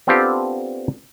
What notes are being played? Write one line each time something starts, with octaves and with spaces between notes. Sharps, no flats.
B3 C4 D4 F4 G4 A4